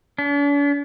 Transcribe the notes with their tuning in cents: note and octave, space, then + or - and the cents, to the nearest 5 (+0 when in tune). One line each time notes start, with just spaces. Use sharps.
D4 -45